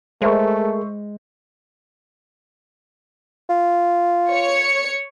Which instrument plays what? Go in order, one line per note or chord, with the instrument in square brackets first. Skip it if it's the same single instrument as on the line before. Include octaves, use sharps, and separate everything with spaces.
[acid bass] G#3 [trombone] A3 [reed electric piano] G#4 A#4 [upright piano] C5 E5 C#6
[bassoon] F4
[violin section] C#5 C#7